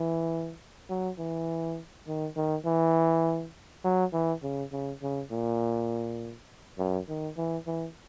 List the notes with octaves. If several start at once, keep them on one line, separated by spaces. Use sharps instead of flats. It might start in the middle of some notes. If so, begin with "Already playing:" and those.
Already playing: E3
F#3
E3
D#3
D#3
E3
F#3
E3
C#3
C#3
C#3
A#2
F#2
D#3
E3
E3